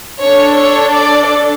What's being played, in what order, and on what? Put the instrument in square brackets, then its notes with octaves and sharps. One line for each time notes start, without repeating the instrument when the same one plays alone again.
[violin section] D4 A4 C#5
C#5
D5